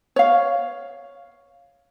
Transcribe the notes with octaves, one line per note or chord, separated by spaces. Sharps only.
C#5 F5